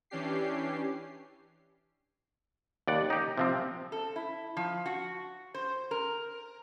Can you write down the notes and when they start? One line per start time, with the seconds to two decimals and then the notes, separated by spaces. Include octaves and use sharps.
0.10 E3 C#4 D4 G4 C7
2.88 D#2 D5 F#5
3.10 D#4 G4
3.37 C3 F3 C4
3.92 A4
4.16 E4
4.57 F3
4.86 F#4
5.54 C5
5.91 A#4